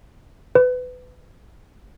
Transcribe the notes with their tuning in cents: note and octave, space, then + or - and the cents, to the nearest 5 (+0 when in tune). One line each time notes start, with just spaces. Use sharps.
B4 +25